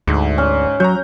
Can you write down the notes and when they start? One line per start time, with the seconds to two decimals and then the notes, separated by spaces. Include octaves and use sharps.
0.07 D2 G#2
0.38 C#4
0.80 F#3 A#5 C#6 G6